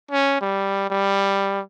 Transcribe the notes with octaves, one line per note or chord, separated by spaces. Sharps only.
C#4
G3
G3